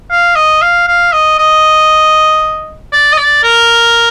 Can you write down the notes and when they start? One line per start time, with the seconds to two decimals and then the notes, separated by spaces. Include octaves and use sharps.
0.11 F5
0.36 D#5
0.62 F5
0.88 F5
1.13 D#5
1.38 D#5
2.92 D5
3.12 D#5
3.17 D5
3.43 A#4